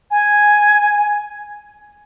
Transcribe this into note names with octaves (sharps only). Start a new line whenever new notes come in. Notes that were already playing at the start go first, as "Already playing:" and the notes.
G#5